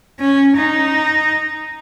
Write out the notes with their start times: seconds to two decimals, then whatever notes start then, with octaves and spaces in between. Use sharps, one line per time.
0.20 C#4
0.56 D#4